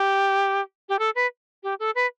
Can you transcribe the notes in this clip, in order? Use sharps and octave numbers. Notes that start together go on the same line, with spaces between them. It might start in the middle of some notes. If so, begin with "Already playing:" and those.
Already playing: G4
G4
A4
B4
G4
A4
B4